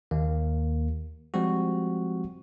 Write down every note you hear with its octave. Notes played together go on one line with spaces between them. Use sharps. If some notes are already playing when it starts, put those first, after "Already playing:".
D#2 A#3
F3 G3 G#3 C4 F#4